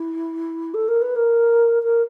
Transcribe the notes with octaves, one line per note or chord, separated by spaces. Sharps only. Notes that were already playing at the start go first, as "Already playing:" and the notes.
Already playing: E4
A4
A#4
B4
A#4
A#4